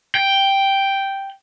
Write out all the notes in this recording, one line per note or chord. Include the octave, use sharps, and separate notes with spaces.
G5